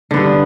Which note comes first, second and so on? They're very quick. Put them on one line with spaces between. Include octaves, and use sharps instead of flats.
D3 B3 G2